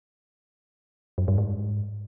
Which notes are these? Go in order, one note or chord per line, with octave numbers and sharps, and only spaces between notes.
F#2
G2
G#2